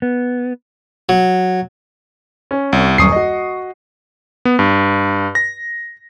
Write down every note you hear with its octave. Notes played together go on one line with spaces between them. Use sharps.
B3
F#3
C#4
C2
D#1 F#2 C#6 D#6 C7
F#4 D#5
B3
G2
A#6